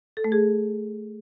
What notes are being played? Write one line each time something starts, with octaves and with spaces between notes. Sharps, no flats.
A4
A3
G#4